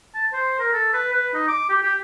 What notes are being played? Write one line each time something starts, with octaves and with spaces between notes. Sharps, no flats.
A5
C5
A#4
A4
B4
B4
D#4
D6
G4
G4